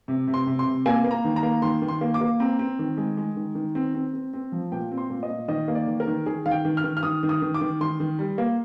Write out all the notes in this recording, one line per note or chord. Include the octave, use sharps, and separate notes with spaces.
C3
C3
C6
C3
C6
C3
A#3 G#5
A#3
A#5
D#3
A#5
A#3
D#3 C6
D#3
C6
A#3
D6
A#3
C4 A#5
C4
D#3
G#3
G#3
D#3
D#3
C4
C4
C4
C4
F3
A#2 G5
C4
C6
A#2
D#5
A#2
D#3 D#5
A#3
D5
D#3
A#4
D#3
D#3 G#4
D#3 F5
G5
D#3
F6
D#3
F6
D#3 D#6
D#3
D#6
D#3
D6
D#3
D#3 C6
D#3
G3
A#3